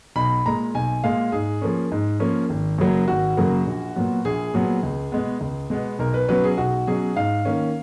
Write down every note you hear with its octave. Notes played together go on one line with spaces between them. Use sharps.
B1 B5
A#2 G#3 A#5
B1 G#5
A#2 G#3 F5
G#2 G#4
F3 A#3 C#4
G#2
F3 A#3 C#4
G#1
F#2 C#3 F#3 A#3
G#1 F#4
F#2 C#3 F#3 A#3
A#1
A#2 F#3 B3
A#1 G#4
A#2 F#3 B3
C#2
B2 G#3 B3
C#2
B2 G#3 B3
B1 A#4
B4
B2 F#3 C#4 B4
G#4
B1 F#4
B2 F#3 C#4 G#4
G#2 F5
D#3 A#3 C#4